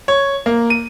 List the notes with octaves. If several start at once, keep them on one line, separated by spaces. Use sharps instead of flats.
C#5
A#3
D#7